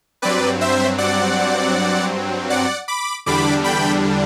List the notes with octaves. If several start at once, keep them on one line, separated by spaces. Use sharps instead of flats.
G2 F#3 C4 B4 D5
C5 E5
D5 F#5
D5 F#5
B5 D6
E2 D3 G3 D4 B5 D6
G5 B5